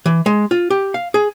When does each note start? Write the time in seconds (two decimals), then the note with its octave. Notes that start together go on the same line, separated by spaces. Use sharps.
0.06 E3
0.26 G#3
0.51 F4
0.70 G4
0.94 F5
1.14 G#4